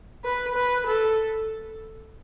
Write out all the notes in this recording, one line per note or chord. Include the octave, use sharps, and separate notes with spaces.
B4
B4
A4